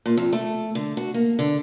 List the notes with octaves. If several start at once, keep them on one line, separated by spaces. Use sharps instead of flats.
A#2
F2
A3
D3
F#4
A#3
D3